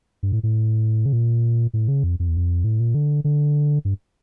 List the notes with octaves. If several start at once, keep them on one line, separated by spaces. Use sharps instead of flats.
G2
A2
A2
C#3
A#2
A2
C#3
F2
F2
E2
F2
A2
A#2
D3
D3
G2